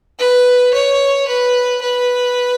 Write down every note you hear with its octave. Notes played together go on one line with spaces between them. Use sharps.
B4
C#5
B4
B4